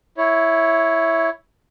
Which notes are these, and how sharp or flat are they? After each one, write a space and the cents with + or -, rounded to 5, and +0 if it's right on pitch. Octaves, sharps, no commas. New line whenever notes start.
E4 +0 C#5 +0